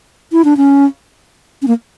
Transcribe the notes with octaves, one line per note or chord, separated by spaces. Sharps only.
E4
D4
C#4
C#4
A#3